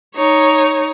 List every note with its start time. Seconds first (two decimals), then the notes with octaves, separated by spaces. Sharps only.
0.16 D#4 C#5